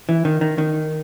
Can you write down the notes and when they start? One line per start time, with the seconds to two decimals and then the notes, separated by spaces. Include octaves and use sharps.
0.09 E3
0.25 D#3
0.41 D#3
0.58 D#3